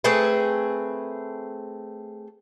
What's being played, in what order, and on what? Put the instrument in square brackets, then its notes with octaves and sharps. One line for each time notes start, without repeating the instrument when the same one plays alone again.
[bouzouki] A3 C4 G#4 B4